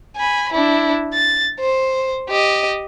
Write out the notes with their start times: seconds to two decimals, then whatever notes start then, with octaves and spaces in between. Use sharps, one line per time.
0.17 G#5 B5
0.53 D4 E4
1.13 A6
1.60 C5
2.29 G4 D#5